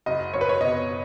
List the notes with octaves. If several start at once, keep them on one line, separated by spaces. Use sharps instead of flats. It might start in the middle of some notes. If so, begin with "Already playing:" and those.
F#1 D#5
F#1 C#5
B4
C#5
B2 D#5